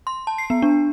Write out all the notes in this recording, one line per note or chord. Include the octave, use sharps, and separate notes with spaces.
C6
A5
C7
B3
D4